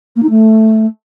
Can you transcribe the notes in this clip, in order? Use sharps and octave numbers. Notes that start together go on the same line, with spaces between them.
A#3
D#4
A3